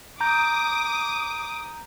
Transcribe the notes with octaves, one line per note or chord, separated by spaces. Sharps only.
A#5 D6 D#6 G6